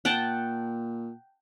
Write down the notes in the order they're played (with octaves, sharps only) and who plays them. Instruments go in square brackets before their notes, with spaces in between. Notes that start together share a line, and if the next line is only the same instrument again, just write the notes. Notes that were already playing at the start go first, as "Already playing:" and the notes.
[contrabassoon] A#2 [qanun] F#5 G5 A5